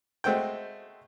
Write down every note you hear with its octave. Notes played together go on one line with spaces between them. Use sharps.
G#3 A3 C4 F#4 G5